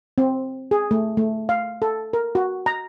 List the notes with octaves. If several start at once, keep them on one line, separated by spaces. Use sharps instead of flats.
C4
G#4
A3
A3
F5
A4
A#4
F#4
A#5